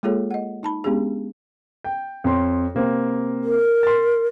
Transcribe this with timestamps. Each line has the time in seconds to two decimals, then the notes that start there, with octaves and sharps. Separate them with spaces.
0.03 G#3 A#3 F4 G#4 A4 C#5
0.31 D#5 F#5
0.63 D#4 A5 B5
0.84 G#3 B3 C#4 D4 G4 G#4
1.84 G5
2.24 F2 C#5 C6
2.75 C3 A#3 C4
3.44 A#4
3.83 C6 A6